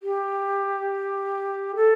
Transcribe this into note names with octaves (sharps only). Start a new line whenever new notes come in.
G4
A4